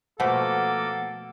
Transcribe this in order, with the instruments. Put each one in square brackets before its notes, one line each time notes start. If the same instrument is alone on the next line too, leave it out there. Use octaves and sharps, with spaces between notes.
[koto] B2 F3 A3 [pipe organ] A#3 D6 [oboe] A4 [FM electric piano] F#5